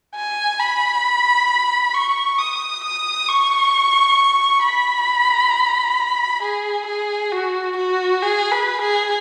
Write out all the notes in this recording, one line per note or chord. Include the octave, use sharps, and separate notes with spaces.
G#5
B5
C#6
D#6
D#6
C#6
B5
G#4
G#4
F#4
F#4
G#4
B4
G#4